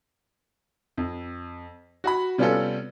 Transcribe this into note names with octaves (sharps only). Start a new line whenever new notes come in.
F2
F#4 F#5 B5
C3 G3 B3 C#4 F4 A4